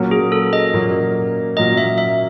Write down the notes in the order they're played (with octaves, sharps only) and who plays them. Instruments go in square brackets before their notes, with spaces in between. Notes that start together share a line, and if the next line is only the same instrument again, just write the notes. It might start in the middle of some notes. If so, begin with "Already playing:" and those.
Already playing: [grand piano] A#2 F#3 A#3 C#4
[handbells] G#4
A4
D#5
[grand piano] A#2 F#3 A#3 C#4
[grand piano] A#2 F#3 A#3 C#4 [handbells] D#5
[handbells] E5
E5